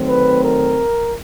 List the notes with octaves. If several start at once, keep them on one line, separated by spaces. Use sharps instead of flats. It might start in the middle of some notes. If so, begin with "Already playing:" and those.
Already playing: D#3 F#3 A3 C4
B4
A#4